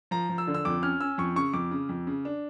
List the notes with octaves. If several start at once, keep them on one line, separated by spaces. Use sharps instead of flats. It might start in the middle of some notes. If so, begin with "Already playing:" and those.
F3 A#5
F3
E6
D3
E6
F2 D6
C#4 F6
C#4 E6
F2 C#6
C#3 C#6
F2 D6
C#3
F2
C#3
D4